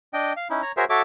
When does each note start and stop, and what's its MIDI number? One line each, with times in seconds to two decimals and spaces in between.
0.13 0.33 62
0.13 0.33 75
0.13 0.33 79
0.37 0.48 77
0.50 0.62 61
0.50 0.62 63
0.50 0.62 64
0.62 0.72 73
0.62 0.72 82
0.77 0.85 66
0.77 0.85 68
0.77 0.85 70
0.77 0.85 72
0.77 0.85 73
0.77 0.85 76
0.90 1.02 66
0.90 1.02 69
0.90 1.02 73
0.90 1.02 76
0.90 1.02 86